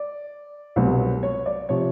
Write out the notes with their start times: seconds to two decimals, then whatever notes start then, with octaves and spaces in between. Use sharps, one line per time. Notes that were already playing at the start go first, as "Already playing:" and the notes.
Already playing: D5
0.76 C2 B2 F#3
1.23 C#5
1.46 D5
1.69 C3 F3 C#5